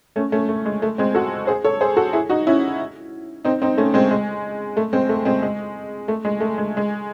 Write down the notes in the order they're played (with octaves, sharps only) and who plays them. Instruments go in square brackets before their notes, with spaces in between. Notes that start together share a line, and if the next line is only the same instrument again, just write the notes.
[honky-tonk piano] A3 C#4
A3 C#4
A3
G#3
A3
G#3 C4
F#4 A4
G#4 C5
A4 C#5
G#4 C5
F#4 A4
E4 G#4
D#4 F#4
C#4 E4
C4 D#4
C4 D#4
A3 C#4
G#3 C4
G#3
A3
G#3 C4
A3
G#3 C4
G#3
A3
G#3
A3
G#3
G#3